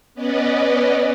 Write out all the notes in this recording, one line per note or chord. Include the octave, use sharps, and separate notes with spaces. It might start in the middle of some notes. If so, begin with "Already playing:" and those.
B3 C#4 B4 D5 D#5